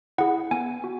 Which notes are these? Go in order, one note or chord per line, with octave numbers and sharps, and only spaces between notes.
E4 G#4 F#5
B3 G#5
F#4